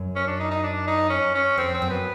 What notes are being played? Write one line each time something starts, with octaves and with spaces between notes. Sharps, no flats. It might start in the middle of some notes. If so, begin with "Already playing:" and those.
Already playing: F#2
C#4
D4
D#4
D#4
D4
D#4
C#4
C#4
F2 C4
C4
F#2
B3